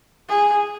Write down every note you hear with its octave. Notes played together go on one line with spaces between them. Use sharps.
G#4